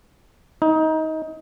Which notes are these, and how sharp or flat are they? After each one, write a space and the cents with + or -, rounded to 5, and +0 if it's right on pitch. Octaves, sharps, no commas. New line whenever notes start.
D#4 +25